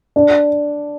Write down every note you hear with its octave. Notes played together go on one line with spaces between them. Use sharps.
D4